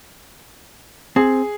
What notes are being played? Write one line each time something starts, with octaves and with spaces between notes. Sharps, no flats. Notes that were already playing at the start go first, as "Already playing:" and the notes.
C4 G#4